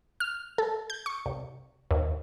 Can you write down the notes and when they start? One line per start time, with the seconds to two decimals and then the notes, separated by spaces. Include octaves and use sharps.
0.20 F6
0.58 A4
0.90 G6
1.06 C#6
1.26 C2
1.91 D#2